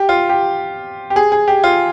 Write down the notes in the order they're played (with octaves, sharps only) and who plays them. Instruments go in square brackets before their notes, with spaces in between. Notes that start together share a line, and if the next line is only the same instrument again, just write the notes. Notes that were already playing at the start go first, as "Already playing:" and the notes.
Already playing: [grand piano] G4
F4
G4
G4
G#4
G#4
G4
F4